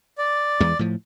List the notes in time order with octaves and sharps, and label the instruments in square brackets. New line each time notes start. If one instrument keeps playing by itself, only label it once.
[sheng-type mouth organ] D5
[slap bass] E2 E3 G#3
A2 F3